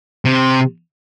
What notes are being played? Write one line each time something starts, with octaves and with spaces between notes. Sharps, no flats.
C3